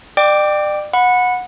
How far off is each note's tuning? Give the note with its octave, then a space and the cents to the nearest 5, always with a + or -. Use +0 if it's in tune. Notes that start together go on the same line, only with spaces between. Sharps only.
D5 +35 G5 +0 D6 +0
F#5 -20 B5 +0